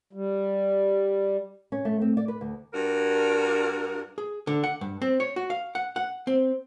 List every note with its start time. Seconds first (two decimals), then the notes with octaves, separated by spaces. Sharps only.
0.13 G3
1.72 C#4
1.85 A3
2.02 C4
2.17 D5
2.28 B4
2.41 D2
2.73 G2 F#4 A#4
4.18 G#4
4.47 D3
4.63 F#5
4.81 G2
5.02 C4
5.20 C#5
5.36 F#4
5.50 F5
5.75 F#5
5.96 F#5
6.27 C4